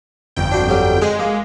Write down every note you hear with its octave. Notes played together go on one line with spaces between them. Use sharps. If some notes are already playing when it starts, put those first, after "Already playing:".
G1 F2 G5
D4 F#4 C5
D3 F#3 G3
G#3 G#4 D#5
A#3